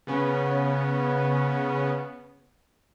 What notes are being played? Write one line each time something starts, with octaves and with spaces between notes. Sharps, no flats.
C#3 B3 C#4